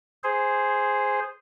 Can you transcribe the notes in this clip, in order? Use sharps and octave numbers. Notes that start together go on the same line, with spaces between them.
G#4 C5